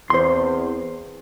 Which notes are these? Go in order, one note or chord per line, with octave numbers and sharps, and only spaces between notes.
E2 C4 C5 C6